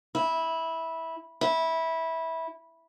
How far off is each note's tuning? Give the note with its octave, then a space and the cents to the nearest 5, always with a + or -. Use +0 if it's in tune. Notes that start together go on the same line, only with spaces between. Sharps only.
E4 -15
E4 -15